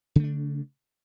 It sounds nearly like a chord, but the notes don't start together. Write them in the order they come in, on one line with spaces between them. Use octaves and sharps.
C#3 A3 D4